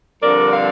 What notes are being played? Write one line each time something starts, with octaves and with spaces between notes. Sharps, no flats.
G2 D3 F3 C4 A#4 D5
D5 F5